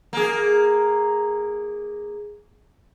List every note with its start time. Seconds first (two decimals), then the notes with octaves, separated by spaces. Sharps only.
0.13 A#3 G#4